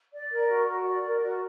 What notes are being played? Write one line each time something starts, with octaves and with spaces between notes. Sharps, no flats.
D5
A#4
F#4
F#4
D5
A#4
F#4